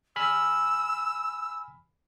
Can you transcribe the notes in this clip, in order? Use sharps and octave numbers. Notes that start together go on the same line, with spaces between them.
G#5 B5 E6 F6